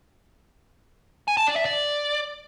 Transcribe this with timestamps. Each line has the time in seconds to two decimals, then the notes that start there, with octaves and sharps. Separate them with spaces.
1.28 G#5
1.37 A5
1.47 D5
1.56 E5
1.65 D5